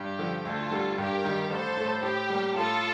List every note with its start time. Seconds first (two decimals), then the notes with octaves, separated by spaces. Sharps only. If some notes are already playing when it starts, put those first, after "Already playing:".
Already playing: G2 G4
0.19 D3 F3
0.45 D2 F4 A4
0.71 D3 G3
0.98 G2 G4 A#4
1.24 D#3 G3
1.50 A1 A4 C5
1.77 A2 A3
2.02 A2 G4
2.30 G3 A#3
2.55 A2 F4 A4